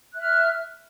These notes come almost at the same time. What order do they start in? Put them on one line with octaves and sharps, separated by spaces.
F#6 E5 F6